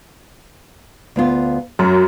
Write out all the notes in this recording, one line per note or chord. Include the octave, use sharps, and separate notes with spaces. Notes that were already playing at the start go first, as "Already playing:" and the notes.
D2 B3 F4
F#2 F#3